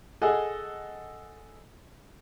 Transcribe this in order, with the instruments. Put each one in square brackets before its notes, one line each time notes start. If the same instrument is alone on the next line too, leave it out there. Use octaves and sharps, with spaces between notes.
[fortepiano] G#4 A4 D#5 F#5 G#5